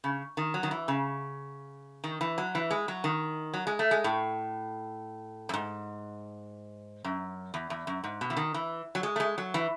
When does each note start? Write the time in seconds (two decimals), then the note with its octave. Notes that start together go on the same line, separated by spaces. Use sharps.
0.04 C#3
0.37 D#3
0.54 F#3
0.63 D#3
0.71 E3
0.88 C#3
2.04 D#3
2.21 E3
2.38 F#3
2.55 E3
2.71 G#3
2.88 F#3
3.04 D#3
3.54 F#3
3.67 G#3
3.79 A3
3.91 G#3
4.04 A2
5.49 F#2
5.54 G#2
7.04 F#2
7.54 E2
7.70 E2
7.87 F#2
8.04 G#2
8.21 B2
8.30 E3
8.37 D#3
8.54 E3
8.95 F#3
9.03 G#3
9.16 A3
9.20 G#3
9.38 F#3
9.54 E3